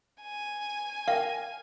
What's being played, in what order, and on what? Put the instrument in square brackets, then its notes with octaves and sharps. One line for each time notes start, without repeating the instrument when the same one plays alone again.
[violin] G#5
[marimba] A#4 G5 [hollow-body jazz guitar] F5